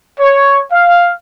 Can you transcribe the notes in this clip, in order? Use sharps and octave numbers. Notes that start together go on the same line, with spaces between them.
C#5
F5